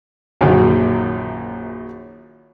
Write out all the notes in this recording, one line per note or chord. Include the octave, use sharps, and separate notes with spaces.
A#1 F#2 A#2 D#3 F#3